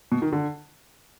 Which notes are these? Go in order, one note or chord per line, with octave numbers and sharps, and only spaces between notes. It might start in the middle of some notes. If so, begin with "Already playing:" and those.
B2
D#3
D3